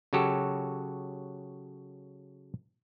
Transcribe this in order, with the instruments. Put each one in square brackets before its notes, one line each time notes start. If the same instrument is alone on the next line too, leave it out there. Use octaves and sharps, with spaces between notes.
[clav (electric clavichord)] C#3 F#3 F#4 G4 A4